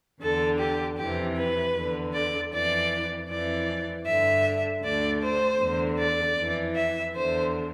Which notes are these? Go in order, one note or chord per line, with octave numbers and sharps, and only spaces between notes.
E2 D3 A4
G4
F2 C3 E3 G4
B4
E2 D3
D5
F2 E3 D5
F2 E3 D5
G2 D3 E5
D2 D3 D5
C5
E2 D3
D5
F2 E3
E5
E2 D3 C5